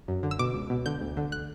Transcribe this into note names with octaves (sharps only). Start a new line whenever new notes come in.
F#2
D3
E6
B2 D6
C#2
B2
D3 G6
D2
D3
F#6